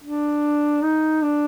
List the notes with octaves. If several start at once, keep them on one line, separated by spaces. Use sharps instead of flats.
D4
D#4
D4